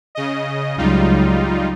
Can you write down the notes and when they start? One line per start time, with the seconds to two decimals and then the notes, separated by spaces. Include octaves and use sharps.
0.15 C#3 D#5
0.78 C#2 F#3 G3 D#4 F4